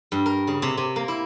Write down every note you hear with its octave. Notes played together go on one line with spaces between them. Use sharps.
G2
A#4
C#3
C3
C3
A#3
E4